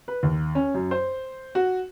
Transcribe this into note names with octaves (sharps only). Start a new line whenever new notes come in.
B4
D#2
C#4
F#2
C5
F#4